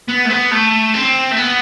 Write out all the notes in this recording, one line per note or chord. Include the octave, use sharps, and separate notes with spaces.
B3
A3
B3
A3
C4
A3
B3